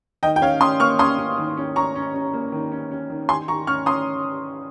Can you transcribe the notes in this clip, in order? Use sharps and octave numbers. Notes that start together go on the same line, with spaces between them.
D#3 D#5 G5
G5
C#4 C#5 F5
C#4 C6 D#6
A#3 C#6 F6
C#4 C6 D#6
C#4
D#3
C#4
C#4 A#5 C#6
C#4
C#4
A#3
D#3
C#4
C#4
D#3
D#3 G#5 C6
D#3 A#5 C#6
C#4 C#6 F6
C#4 C6 D#6